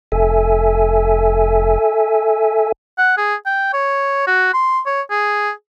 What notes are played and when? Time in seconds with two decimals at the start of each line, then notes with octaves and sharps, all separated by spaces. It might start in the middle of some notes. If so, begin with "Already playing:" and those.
0.12 F1 A4 E5 G#5
2.98 F#5
3.17 G#4
3.46 G5
3.73 C#5
4.27 F#4
4.53 C6
4.86 C#5
5.10 G#4